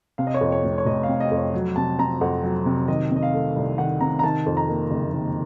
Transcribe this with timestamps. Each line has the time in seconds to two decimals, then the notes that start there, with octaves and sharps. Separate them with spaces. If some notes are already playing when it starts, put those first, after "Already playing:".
0.18 C3 F5
0.27 D#5
0.34 C#5
0.41 F2 D#5
0.52 C#5
0.63 F1
0.78 C#5
0.86 F1 D#5
1.03 F5
1.08 C3
1.20 D#5
1.31 F2
1.37 C#5
1.54 F#3
1.76 C3 A5
1.99 C4 A#5
2.21 F2 F#5
2.43 F#3
2.66 C3
2.88 D#3 D#5
3.11 C3 D#5
3.23 F5
3.34 A3
3.56 C2
3.78 D#3 F#5
4.01 C3 A#5
4.19 A#5
4.23 D#3 A5
4.46 F2
4.57 A#5
4.69 A#3
4.91 F#1
5.14 D#3